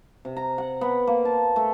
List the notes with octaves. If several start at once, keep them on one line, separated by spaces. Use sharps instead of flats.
C3
A#5
F#5
B3
A#3
A5
A3